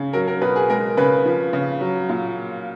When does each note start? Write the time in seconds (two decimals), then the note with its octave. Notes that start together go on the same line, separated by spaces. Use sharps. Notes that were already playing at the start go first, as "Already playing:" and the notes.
Already playing: C#3
0.13 F#3 A#4
0.28 A#4
0.41 B2 B4
0.56 G#4
0.70 G#3 A#4
0.97 C#3 B4
1.25 F3
1.53 C#3
1.81 F#3
2.09 A#2